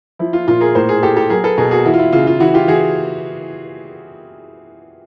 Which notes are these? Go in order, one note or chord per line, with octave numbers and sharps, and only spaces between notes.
F3 E4
F4
A#2 F4
G#4 A#4
A2 A#4 C5
G#4 A#4
A2 G4 A4
G4 A4
F#3 G#4 A#4
A4 B4
B2 G#4 A#4
F#4 G#4
E3 E4 F#4
F4
E4
C#3 F4
F4
E3 E4 F#4
F4 G4
E3 F#4 G#4